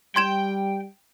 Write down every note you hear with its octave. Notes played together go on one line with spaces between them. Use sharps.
G3 G5 C6 G#6 E7